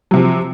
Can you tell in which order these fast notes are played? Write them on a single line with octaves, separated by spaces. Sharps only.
F#3 C3 F3